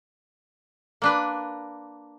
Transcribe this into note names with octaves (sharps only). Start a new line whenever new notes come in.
A#3 D4 B4